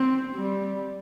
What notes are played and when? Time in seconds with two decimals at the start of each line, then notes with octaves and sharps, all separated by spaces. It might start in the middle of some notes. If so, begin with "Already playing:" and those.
Already playing: C4
0.35 G3